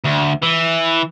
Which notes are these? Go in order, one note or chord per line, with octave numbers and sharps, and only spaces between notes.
D2
E3